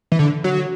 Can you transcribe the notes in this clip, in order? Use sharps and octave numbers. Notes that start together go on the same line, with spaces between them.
E3
D3
F#3